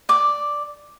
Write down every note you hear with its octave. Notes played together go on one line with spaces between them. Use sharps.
D5 D6